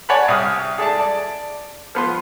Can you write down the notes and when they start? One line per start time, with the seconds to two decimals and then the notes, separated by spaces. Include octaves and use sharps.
0.09 C#5 D5 F#5 G#5 A5 B5
0.28 C2 D#6 F6
0.78 G#4 A4 D5 E5 A5
0.99 D5 A5
1.95 F3 B3 C6